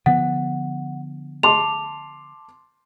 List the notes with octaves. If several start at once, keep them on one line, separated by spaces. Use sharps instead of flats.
D3 F3 B3 F#5
A5 C6 D6 F7